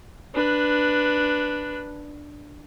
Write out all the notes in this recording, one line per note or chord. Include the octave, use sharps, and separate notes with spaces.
D4 B4